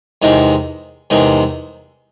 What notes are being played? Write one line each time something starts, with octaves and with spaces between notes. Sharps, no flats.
E2 C3 D#3 G#3
E2 C3 D#3 G#3